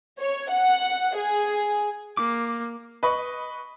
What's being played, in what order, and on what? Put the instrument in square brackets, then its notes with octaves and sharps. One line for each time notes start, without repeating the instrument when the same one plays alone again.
[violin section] C#5
F#5
G#4
[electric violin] A#3 [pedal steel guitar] D6
[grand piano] B4 D#5 B5 C#6